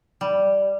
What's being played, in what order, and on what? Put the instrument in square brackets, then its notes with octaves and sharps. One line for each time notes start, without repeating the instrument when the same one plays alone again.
[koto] G3